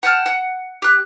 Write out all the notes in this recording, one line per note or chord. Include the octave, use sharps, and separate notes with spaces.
F#5 G5 A5 F6
F#5
G4 F#6